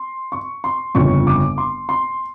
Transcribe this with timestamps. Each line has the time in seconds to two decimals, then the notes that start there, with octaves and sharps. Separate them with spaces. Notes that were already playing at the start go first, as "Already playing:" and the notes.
Already playing: C6
0.32 C#6
0.64 C6
0.94 G1 F2 C#3 C#6
1.27 D6
1.58 C6
1.89 C6